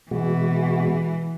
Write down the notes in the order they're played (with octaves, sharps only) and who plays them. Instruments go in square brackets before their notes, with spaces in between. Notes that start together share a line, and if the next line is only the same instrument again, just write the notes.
[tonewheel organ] B2 G#3 F#4 [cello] E3